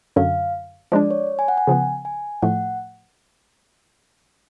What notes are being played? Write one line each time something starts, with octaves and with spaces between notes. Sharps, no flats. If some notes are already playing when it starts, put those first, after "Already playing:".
F#2 D3 F#3 F5
F3 G#3 D4 D5
C#5
G#5
F#5
G#5
C#3 F3 B3
G#5
A2 F3 A3 F#5